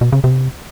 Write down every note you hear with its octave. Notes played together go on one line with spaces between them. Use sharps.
B2
C#3
C3